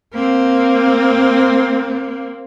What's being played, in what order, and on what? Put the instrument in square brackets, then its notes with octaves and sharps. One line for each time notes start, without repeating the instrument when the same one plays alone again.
[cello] A#3 C4